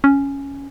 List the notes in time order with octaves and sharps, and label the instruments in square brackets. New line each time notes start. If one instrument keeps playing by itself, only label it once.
[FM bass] C#4